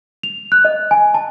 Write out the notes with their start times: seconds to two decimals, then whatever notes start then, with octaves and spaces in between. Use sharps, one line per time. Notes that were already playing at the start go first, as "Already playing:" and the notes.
0.23 F7
0.52 F#6
0.65 D#5
0.91 G#5
1.14 A5